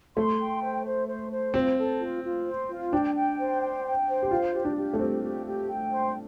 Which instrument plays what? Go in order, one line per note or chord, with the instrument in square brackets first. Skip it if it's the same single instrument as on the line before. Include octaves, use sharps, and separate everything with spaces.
[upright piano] A3 [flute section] C6
[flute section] G5
C5
C5
C5
C5
[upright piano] C4 [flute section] F4
[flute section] A4
F4
F4
C5
F4
[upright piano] D4 [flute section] G5
[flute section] G5
C5
G5
G5
C5
[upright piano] G4
[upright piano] F4 [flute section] F5
[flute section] G4
[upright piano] D4
[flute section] G4
[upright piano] A3
[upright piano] C4 [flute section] G4
[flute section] G4
G4
G5
C5